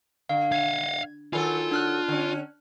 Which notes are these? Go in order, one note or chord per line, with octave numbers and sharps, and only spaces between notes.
D3 F5
F5 F#5 G#6
D#3 F#3 F4 A4 G#5
D4 F6 F#6
D3 C#4